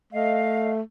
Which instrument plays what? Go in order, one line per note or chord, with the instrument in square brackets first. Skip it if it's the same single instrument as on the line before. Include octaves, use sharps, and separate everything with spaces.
[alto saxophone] A3 [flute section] D#5 F5